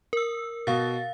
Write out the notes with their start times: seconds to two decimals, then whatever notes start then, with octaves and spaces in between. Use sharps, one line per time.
0.13 A#4 E6
0.67 B2 F5 A6